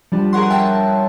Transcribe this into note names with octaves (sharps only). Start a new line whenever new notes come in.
F3 G3 D4
G#4 A#4 C#5 F#5 C6
A#4 E5 G5 A5